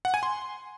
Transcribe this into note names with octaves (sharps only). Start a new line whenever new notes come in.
F#5
G#5
C6